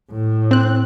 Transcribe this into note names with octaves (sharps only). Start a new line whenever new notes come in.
A2
C4 F#6